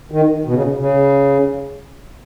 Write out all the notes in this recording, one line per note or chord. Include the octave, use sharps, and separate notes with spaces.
D#3
B2
C#3
B2
C#3